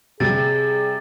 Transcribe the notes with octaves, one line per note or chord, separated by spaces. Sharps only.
C3 G3 G#4 A6